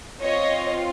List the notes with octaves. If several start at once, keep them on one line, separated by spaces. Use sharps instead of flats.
C4 F4 C#5 D#5